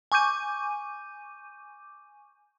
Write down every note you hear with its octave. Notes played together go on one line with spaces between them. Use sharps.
G#5 C#6 D6 G6 D#7